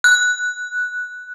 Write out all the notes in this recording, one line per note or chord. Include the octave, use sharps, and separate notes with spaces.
F#6